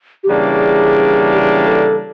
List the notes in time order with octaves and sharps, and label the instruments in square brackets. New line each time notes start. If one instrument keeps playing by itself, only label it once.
[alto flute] G4
[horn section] C#3 E3 G3 A#3 D4 [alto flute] G#4
[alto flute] G4
G#4
A4